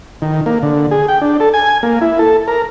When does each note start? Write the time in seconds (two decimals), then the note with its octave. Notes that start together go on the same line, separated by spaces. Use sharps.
0.22 D#3
0.46 A#3
0.63 D3
0.91 G#4
1.08 G5
1.21 D4
1.40 A4
1.54 G#5
1.83 A#3
2.01 E4
2.19 A4
2.48 A#4